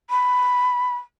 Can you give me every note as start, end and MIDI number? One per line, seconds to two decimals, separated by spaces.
0.10 0.95 83